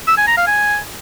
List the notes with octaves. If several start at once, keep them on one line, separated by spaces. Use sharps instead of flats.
E6
G#5
A#5
F5
G#5